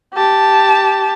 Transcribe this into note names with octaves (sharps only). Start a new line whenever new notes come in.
G4 A5